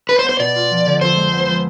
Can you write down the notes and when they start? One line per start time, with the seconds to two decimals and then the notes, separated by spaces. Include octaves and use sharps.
0.08 D4 B4
0.19 C5
0.24 B3
0.29 C5
0.39 B2 D5
0.56 F4
0.70 F3
0.86 D3
1.01 F2 C5
1.16 G#3
1.32 B3
1.47 F3